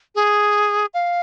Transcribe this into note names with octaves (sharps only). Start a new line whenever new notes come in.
G#4
F5